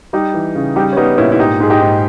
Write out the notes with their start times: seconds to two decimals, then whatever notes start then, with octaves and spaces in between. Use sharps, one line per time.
0.13 G3 D#4 G4
0.34 E3
0.55 C#3
0.76 G3 D#4 G4
0.93 C#4
0.97 G3 B3 D#4
1.18 A#2 C#4 E4
1.32 E4
1.39 G#2 D#4 G4
1.60 G#2 G#4
1.70 D#4 G4
1.80 G#2